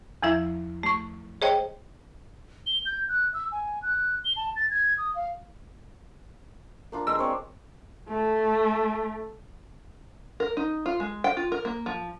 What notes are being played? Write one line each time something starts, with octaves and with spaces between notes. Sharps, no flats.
E2 F3 E4 E5
A3 C#6
G#4 C5 C#5 D#5 G5
G7
G6
F#6
E6
G#5
F#6
G7
A5
A6
G#6
D#6
F5
A#3 D4 F4
G#3 E6
C4 C#5 D5
A3
A#4
D#4
F4
G#3
G5
F4
A#4
A#3
F3